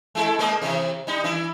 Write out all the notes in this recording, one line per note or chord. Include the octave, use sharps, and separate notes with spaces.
G#3 E4 A4
G#3 A#3 D#5
C3 E3
G3 D#4
E3 E4